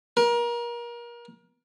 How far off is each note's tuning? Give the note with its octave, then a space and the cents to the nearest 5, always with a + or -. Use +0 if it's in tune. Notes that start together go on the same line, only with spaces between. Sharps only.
A#4 +30